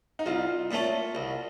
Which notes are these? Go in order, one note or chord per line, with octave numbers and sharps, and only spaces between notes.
D#4
C2 F4
A#2 A3 C#4
C2